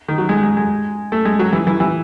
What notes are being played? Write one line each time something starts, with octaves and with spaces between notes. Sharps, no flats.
D#3
F#3
G#3
G#3
G#3
A3
G#3
F#3
E3
E3
E3